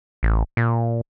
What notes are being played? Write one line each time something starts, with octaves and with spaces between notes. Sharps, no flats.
A1
A#2